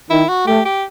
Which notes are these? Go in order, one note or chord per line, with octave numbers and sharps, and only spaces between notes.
D#3 E4
F#4
A3 G4
G4